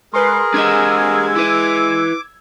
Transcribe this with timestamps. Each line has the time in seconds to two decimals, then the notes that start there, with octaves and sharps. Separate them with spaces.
0.14 G#3 G#4 A#4 B4 C6
0.54 G#3 D4 G4 D#5 E6 G#6
1.36 E4 B4 D6